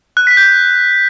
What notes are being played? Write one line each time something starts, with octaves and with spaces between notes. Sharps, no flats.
F#6
B6
G6